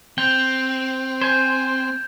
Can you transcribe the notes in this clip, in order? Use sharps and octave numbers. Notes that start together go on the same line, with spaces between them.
C4 G5 G6 F7
C5 G#5 G6 G#6